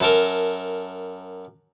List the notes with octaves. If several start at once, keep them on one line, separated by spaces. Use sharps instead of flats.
F#2 A4 A#4